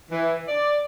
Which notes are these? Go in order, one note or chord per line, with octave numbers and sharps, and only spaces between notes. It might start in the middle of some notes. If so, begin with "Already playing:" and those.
E3
D5